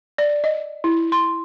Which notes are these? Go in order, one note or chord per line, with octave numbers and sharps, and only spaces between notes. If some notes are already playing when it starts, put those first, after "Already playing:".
D5
D#5
E4
C6